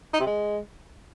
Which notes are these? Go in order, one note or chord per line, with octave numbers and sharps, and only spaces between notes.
D#4
C3
G#3